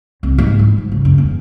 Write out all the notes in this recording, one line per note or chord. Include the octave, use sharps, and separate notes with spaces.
C2
G#2
E4
G#2
C#3
F#2
E2